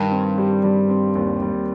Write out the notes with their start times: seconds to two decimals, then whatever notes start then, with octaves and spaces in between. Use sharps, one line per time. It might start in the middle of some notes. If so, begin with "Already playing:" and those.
Already playing: G2 D#3
0.12 C4
0.38 G3
0.63 G3
0.89 C4
1.15 D#2
1.42 G3